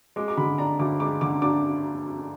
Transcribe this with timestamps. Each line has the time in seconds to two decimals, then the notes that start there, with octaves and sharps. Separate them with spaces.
0.16 G#3 D6
0.28 D6
0.37 D3 B5
0.58 D4 A#5
0.79 D2 D6
1.00 G#3 D6
1.21 D3 D6
1.42 D4 D6